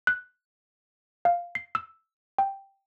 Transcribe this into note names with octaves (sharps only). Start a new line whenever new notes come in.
F#6
F5
C7
E6
G5